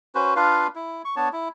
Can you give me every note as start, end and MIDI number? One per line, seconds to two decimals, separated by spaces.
0.15 0.34 61
0.15 0.34 66
0.15 0.34 71
0.15 0.34 72
0.36 0.67 62
0.36 0.67 65
0.36 0.67 71
0.36 0.67 77
0.75 1.02 64
1.05 1.15 85
1.16 1.29 59
1.16 1.29 62
1.16 1.29 73
1.16 1.29 81
1.33 1.49 64